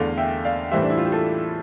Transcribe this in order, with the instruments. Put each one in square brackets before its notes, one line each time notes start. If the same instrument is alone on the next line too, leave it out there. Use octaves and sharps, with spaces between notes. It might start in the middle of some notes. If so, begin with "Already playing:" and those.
Already playing: [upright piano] E2 D3 A3 D5 F5
E5 G5
D5 F5
A2 E3 G3 C5 E5
D4
E4
F4
G4
F4 A4